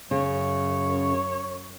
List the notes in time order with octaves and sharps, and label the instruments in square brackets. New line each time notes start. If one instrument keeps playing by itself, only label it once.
[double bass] F#2 [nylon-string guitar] C#3 [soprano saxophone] C#5